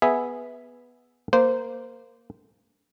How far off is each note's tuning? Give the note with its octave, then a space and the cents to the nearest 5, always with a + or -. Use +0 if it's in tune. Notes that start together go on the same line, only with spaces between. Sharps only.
B3 +0 G#4 +0 E5 +0
A#3 +0 C5 -20